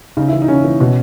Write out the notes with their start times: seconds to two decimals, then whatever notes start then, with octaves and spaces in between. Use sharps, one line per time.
0.17 C#3 D#4
0.28 E4
0.33 E3
0.42 D#4
0.48 C#3 C#4
0.64 E3
0.80 B2